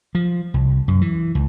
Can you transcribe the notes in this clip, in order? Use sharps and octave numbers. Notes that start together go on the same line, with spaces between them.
F3
C2
F#2
E3
C#2